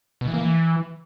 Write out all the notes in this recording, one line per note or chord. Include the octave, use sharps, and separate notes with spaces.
B2
E3
A#3
E3